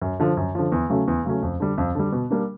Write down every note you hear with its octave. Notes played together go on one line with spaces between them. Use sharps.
F#2
D3 F3
F#2
D3 F3
E2
C#3 F#3 A3 C#4
E2
C#3 F#3 A3 C#4
F2
D3 G3
F2
D3 G3
B2
G3 A#3 D4